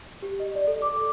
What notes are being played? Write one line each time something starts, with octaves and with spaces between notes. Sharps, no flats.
G4
D#5
D5
A4
D6
D6